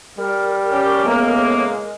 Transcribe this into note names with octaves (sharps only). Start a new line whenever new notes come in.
G3 A#4
C#4 G4
A2 C#3 G#3 A#3 B3